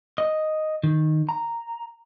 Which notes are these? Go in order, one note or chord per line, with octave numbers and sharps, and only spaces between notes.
D#5
D#3
A#5